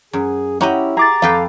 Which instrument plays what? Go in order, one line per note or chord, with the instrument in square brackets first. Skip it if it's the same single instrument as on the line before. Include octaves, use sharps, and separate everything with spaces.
[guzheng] F#2 [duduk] G#4
[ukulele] C#4 A#5 [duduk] E4 [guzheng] F#4 G4 D#5
[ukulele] G#4 [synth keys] A#5 D6 A6
[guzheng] F2 B4 G5 [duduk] A4 [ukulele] F5